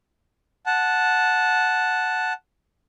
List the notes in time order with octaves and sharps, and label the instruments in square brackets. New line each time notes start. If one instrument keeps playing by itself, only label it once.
[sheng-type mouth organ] F#5 A5